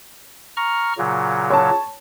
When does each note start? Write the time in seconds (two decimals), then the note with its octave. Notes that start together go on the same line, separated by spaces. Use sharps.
0.57 A#5 C#6 F6
0.98 A#2 C#3 F#3
1.50 C#5 A5